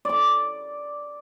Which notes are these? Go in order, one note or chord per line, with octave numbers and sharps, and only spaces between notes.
D5 D6